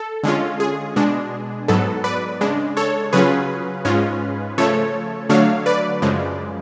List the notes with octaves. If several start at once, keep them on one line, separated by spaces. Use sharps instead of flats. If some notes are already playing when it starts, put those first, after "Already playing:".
Already playing: A4
D3 G#3 C#4 F4
G#4
B2 G#3 D4
G#2 F#3 B3 A4
B4 D5
C#3 G#3 D4
A4 C#5
C#3 F#3 C#4 F4 G#4 B4
G#2 G#3 C#4 F4
C#3 F3 A3 A4 C#5
D3 F#3 A3 D4 C#5 F5
B4 D5
F#2 C#3 F3 G#3